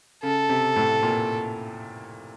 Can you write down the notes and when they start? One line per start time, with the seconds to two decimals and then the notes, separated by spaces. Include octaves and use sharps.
0.23 C#3 A4
0.49 C3
0.76 A2
1.03 A#2